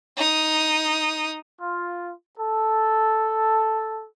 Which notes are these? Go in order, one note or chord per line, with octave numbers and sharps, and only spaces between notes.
D#4 D#6
F4
A4